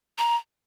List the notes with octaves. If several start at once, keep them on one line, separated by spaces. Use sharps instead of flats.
A#5